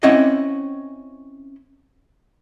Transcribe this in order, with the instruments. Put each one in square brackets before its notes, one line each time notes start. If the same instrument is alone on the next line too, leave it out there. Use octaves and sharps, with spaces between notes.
[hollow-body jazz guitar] C4 C#4 E4 D#5 F#5